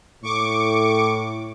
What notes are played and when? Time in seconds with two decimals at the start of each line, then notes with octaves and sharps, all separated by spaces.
0.23 A2 C#6 D6